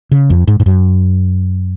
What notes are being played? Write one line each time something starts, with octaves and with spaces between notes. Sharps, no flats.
C#3
F2
G#2
G#2
F#2